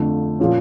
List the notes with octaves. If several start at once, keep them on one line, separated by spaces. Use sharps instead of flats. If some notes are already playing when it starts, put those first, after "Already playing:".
Already playing: F2 D3 F3 A3 D4
A#2 F3 C#4